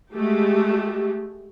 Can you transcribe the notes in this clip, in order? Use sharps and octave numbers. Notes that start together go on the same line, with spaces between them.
G#3 A3 F#4 G4